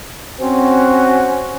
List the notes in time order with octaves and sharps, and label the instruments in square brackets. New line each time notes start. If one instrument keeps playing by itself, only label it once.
[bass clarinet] C4 [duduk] C#4 [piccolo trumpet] F#4 [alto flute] C5